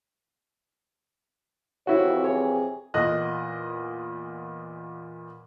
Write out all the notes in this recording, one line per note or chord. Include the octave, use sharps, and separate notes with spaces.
F2 C3 E3 E4 F#4 C#5
G#4 C#5
E2 A#2 D#5 F#6